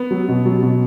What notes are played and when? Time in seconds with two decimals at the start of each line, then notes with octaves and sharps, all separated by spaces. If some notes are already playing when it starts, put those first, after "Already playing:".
Already playing: B3
0.11 F#3
0.29 B2
0.46 F#3
0.63 B2